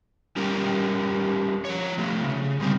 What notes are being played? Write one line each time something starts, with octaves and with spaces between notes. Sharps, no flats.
G3 C#4 G4 A#4
F3 C#5
F3 A3
C#3
D3 G3 C4